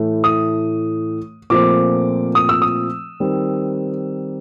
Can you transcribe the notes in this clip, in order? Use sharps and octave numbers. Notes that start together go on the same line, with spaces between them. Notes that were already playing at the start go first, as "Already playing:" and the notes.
Already playing: A2 E3 A3
D#6
A#2 F3 A3 C4 D6
D#6
E6
D#6
D#3 G3 C4